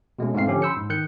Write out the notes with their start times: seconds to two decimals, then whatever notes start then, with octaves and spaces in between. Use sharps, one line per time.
0.19 B2 G#3 A3 C#4
0.34 G#2 A3 C4 F5 C7
0.47 D3 F3 C#4 G4
0.62 B5 C6 E6 G6 C#7
0.76 G#2
0.90 D#3 F#6 G6 C#7